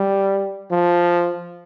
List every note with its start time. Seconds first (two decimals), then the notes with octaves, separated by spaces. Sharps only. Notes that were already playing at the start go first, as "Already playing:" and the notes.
Already playing: G3
0.71 F3